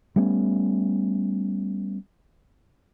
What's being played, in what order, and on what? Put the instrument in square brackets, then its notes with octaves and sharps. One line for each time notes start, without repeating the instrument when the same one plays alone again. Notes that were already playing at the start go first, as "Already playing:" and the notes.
[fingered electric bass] G3 A3 B3 C#4